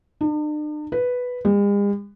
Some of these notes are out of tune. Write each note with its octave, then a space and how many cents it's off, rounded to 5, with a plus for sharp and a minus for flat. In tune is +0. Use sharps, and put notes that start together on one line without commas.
D4 +45
B4 +0
G#3 -45